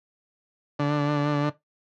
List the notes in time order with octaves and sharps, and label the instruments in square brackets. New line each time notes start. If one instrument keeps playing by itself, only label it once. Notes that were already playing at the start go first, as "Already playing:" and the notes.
[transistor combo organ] D3